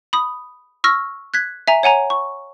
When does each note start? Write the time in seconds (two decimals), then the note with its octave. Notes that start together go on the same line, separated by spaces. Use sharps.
0.13 B5 D#6
0.84 C#6 E6 F6 A#6
1.34 F#6 G#6 B6
1.68 E5 G#5 A#5
1.83 C#5 F#5 G#5 A#5
2.10 C#6